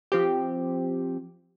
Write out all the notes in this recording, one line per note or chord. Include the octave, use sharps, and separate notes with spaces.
F3 C4 G4